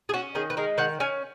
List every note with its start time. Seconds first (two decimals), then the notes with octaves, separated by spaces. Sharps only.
0.09 G#4
0.14 C#4 F#4
0.35 D#3 G#4
0.50 B4
0.57 G#3 A#4
0.78 D#3 F#5
1.00 C#4 G#5